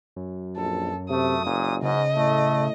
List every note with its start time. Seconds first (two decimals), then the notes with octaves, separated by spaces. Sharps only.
0.16 F#2
0.57 A#1 A4
1.10 C3 A3 D#6
1.45 F#1 A#2
1.82 G#2 C#3 D#5
2.16 A2 A3